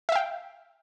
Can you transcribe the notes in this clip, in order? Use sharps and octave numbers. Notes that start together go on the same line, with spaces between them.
E5 F5 G5